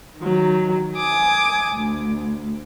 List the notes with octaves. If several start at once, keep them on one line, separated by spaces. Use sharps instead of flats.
D#3 F#3
G#5 D6 D#6
D2